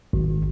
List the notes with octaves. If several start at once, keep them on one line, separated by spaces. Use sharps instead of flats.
G#1